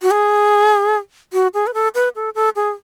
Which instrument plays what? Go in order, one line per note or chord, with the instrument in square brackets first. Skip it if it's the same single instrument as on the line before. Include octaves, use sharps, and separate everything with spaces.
[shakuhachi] F#4
G#4
F#4
G#4
B4
A4
B4
A4
A4
G#4